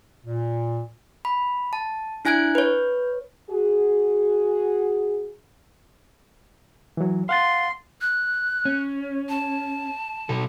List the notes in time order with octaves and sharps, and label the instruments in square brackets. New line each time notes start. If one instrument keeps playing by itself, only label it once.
[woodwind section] A#2
[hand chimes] B5
A5
D4 E4 G#5 F#6 G#6 D7
B4 C#5
[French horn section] F#4 G#4
[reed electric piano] E3 F#3
[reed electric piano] F5 F#5 A6 [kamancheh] C6
[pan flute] F#6
[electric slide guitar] C#4
[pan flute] A5
[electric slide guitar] B2 A4